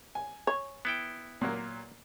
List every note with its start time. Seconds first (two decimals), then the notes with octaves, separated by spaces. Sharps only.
0.15 G#5
0.47 C#5
0.85 B3 E4 G5
1.41 A#2 F#3 A#3